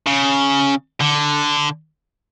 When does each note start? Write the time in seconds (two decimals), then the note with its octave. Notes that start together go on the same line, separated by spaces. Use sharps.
0.06 C#3
1.01 D3